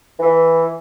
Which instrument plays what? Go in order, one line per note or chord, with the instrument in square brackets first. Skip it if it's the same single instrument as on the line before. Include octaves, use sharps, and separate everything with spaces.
[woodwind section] E3